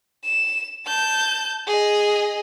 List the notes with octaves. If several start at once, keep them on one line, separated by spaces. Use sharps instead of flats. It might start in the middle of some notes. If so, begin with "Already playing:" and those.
E7
A5 G6
G#4 D#5